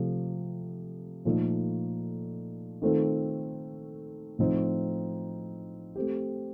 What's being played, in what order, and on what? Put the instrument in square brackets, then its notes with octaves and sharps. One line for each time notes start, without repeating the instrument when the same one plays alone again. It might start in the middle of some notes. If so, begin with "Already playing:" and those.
Already playing: [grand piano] C3 F3 A3
A#2 F3 A3 D#4 A4
D#3 A3 C4 F4 A4
A2 F3 C4 D#4
A3 C4 G4